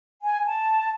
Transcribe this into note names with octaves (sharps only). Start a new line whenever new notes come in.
G#5
A5